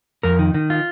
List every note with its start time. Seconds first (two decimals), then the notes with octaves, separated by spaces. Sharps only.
0.23 F2 A#4
0.39 D#3
0.54 D#3
0.70 F4